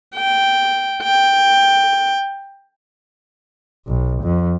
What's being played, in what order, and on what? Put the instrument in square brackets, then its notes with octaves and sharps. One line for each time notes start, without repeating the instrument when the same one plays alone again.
[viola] G5
G5
[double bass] B1
F2